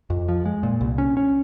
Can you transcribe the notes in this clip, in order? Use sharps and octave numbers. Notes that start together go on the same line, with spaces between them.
F2
F3
G#3
A#2
C2
C#4
C#4